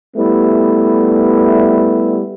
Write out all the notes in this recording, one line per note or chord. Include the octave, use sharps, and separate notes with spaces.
G3 A3 B3 E4